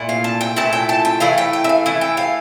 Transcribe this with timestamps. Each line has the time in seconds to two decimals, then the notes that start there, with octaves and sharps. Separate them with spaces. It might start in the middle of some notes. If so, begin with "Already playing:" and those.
Already playing: A#2 A3 E4
0.09 F5
0.24 A5
0.41 G5
0.56 A#2 A3 E4 A5
0.73 G5
0.89 A5
1.05 G5
1.20 E3 A3 E4 F5
1.38 G5
1.53 G5
1.64 E5
1.69 F5
1.86 E3 A3 E4 G5
2.01 G5
2.17 F5